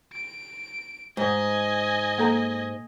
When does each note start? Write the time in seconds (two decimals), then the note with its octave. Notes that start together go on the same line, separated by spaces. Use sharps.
0.14 D7
1.17 G#2 D#5 G#5
2.18 A#3 A4 A#5